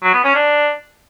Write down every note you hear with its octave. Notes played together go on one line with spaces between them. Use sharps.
F#3
B3
C#4
D4